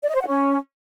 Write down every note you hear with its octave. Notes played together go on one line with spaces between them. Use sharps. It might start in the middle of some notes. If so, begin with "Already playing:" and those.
D5
D#5
C5
F#5
C#4